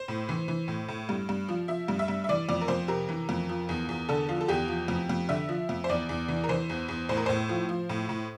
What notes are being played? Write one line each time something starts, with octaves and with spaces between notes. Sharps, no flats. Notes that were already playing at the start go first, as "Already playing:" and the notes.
Already playing: C5
A2
E3
E3
A2
A2
G2
G2
F3
F3 E5
G2
E5
G2
E5
E3 D5
F2 D5
A#4
F2 C5
C3 A#4
E3
F2
F3
E2
E2
D3 A4
F3 F4
A4
E2 G4
F3
F2
F2
D3 E5
F3
F2
C5
E2 D5
E2
E3
A#4
E3 C5
E2
E2
A2 C5
A#4
A2 C5
F3
F3
A2
A2